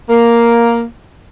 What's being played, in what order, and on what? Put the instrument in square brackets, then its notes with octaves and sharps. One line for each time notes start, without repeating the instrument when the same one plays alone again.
[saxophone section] A#3